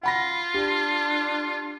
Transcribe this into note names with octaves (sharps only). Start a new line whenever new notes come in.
F4 F#5 B5 A#6
D4 G4